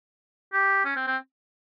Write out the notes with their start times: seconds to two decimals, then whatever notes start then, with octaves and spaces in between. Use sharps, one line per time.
0.53 G4
0.85 C#4
0.96 C4
1.07 C4